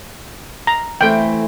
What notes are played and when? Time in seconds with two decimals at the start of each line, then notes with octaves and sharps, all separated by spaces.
0.67 A#5
1.01 E3 A3 C4 G5